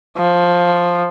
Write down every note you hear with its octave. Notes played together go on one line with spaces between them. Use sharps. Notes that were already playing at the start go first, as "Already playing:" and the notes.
F3